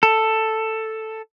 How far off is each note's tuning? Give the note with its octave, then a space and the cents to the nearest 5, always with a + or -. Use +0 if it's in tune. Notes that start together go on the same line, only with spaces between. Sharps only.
A4 +5